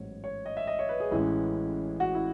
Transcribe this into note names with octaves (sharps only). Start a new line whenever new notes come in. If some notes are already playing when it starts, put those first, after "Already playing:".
Already playing: A1 G#2 F#3 B3 C#5
C#5
D#5
E5
D#5
C#5
B4
G#4
A1 A2 E3 G#3 C#4 E4
F#4
E4